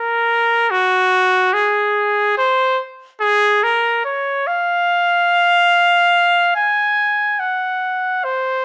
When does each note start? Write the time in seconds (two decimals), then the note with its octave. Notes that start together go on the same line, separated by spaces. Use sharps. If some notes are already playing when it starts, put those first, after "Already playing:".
Already playing: A#4
0.70 F#4
1.54 G#4
2.38 C5
3.21 G#4
3.63 A#4
4.05 C#5
4.47 F5
6.56 G#5
7.40 F#5
8.24 C5